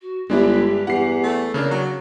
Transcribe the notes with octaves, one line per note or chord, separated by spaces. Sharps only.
F#4
G1 G2 G#3 D4 E4 G4
E2 F#5 C7
A3
C#3 A#3 D4 C#5
F#3